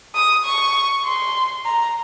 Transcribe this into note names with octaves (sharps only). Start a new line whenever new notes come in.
D#6
C#6
C6
A#5